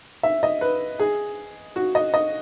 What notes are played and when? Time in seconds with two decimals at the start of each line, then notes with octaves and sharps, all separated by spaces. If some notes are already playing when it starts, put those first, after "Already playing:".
0.23 E5
0.43 D#5
0.61 B4
0.99 G#4
1.76 F#4
1.95 D#5
2.14 D#5